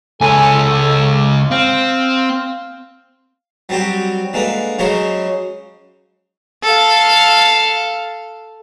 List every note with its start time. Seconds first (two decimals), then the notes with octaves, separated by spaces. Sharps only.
0.21 C#2 C#4 A4 G#5
1.51 C4 F5
3.69 F#3 G3 C4 F#4 G4
4.33 D3 G#3 A#3 B4
4.79 C#3 F#3 G#3 C#4 C5 C#6
6.63 A4 F5